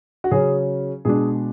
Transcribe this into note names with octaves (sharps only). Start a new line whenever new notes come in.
F#4
C#3 F#3 C#4 G#4
B2 G#3 D4 G#4